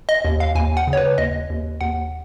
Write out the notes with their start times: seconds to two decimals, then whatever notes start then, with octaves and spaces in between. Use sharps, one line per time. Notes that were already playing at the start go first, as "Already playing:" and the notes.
0.09 D#5
0.25 D#2
0.40 F5
0.55 D#2 G#5
0.77 F#5
0.87 C#3
0.93 C#5
0.97 B4
1.18 D#2 D#5
1.50 D#2
1.81 D#2 F#5